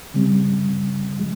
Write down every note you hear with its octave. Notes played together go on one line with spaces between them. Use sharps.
C#3 G3 C4
F3 G#3